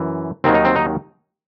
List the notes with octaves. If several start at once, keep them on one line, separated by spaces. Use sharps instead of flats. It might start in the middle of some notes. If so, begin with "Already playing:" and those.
Already playing: F#2 E3
D#2 D#3 F#3 C4
D#4
C4
D#4